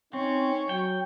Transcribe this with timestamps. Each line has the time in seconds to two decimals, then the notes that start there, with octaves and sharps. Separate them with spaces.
0.13 C4 C#4 D#4 C#6
0.69 F#3 G5